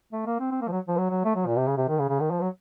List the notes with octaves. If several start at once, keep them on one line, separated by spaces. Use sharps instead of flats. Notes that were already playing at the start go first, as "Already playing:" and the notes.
A3
A#3
C4
C4
A#3
F3
F#3
F3
F#3
F#3
A3
F#3
A#2
C3
C#3
C3
D#3
C#3
C#3
D#3
F3
F#3